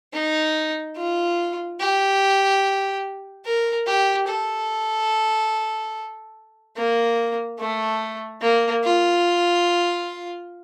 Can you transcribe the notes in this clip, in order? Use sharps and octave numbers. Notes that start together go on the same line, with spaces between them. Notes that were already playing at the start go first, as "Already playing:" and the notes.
D#4
F4
G4
A#4
G4
A4
A#3
A3
A#3
F4